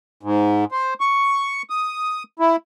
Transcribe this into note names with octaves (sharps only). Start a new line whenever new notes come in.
G#2
C5
C#6
D#6
E4